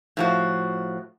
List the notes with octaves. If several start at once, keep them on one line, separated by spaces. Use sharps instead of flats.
A2 F3 F#4